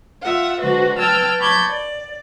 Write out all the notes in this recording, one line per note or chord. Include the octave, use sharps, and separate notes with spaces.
F4 E5 F#5
D3 G#3 F#4 B4 C5
B4 G5 A5 E6 F6 G#6
A5 B5 C#6 D6 G6 G#6
D5